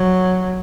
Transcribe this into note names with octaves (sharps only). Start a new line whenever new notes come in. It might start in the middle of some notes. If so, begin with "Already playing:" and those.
Already playing: F#3